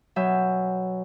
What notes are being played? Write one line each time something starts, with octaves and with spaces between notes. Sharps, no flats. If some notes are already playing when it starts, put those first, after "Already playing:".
B2 F#3 E5 G#5 G6